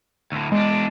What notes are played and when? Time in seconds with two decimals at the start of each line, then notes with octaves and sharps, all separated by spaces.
0.32 D2 A2
0.52 E2 G#3 D4